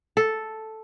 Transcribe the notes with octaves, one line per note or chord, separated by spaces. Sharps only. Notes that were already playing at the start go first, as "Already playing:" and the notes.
A4